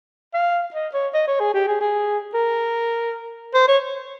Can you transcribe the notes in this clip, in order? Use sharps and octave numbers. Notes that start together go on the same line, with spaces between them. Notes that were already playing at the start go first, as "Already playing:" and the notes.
F5
D#5
C#5
D#5
C#5
G#4
G4
G#4
G#4
A#4
C5
C#5